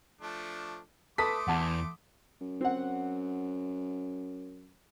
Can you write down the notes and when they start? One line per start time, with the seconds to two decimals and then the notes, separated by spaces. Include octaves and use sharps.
0.21 F3 A3 D4
1.18 A3 A4 B4 C6 D6 D#6 B6
1.48 E2 F#5 A5
2.41 F#2
2.61 C4 F#5